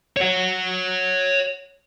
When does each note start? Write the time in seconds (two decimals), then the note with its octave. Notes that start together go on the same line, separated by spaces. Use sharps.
0.17 C#5 F#5